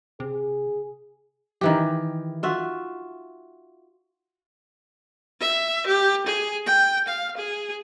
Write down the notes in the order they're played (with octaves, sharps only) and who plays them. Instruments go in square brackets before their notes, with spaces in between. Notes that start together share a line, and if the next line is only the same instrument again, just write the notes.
[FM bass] C3 [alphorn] G#4
[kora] D#3 E3 G4
F4 F#4 E5
[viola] E5
G4
G#4
G5
F5
G#4